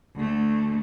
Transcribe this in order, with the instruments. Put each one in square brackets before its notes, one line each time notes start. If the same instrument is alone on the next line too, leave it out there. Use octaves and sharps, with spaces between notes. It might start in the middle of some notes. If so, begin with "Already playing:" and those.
[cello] D2 A3